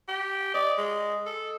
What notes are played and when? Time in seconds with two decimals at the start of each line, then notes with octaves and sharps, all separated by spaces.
0.08 G4
0.54 D5 D#5
0.78 G#3
1.26 A4